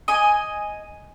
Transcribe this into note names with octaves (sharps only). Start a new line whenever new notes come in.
D#5 G#5